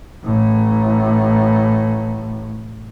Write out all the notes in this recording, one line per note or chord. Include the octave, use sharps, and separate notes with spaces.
A1 A2